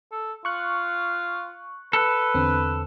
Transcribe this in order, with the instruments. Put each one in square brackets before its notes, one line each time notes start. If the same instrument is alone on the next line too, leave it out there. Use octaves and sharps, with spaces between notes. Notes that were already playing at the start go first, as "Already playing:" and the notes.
[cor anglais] A4
[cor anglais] F4 [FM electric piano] C#6 F#6
[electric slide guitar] A4 [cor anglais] B4
[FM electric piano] E2 D3 C4